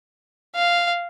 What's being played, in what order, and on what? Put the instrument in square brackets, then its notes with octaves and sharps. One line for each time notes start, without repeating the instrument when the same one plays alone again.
[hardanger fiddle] F5